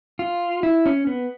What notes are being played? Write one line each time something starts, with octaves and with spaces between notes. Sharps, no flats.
F4
E4
C#4
B3